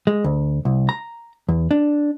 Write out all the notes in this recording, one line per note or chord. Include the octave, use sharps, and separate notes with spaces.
G#3
D2
C2
A#5
E2
D4